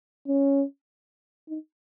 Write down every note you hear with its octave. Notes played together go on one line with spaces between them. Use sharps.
C#4
D#4